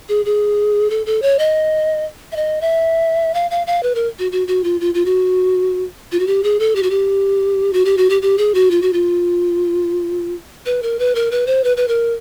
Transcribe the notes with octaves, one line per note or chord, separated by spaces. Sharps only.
G#4
G#4
A4
A4
C#5
D#5
E5
D#5
E5
F5
F5
F5
B4
A#4
F#4
F#4
F#4
F4
F4
F4
F#4
F4
F#4
G4
G#4
A4
G4
F#4
G4
F#4
G4
F#4
G4
G4
G#4
F#4
F4
F#4
F4
B4
A#4
B4
A#4
B4
C5
B4
B4
A#4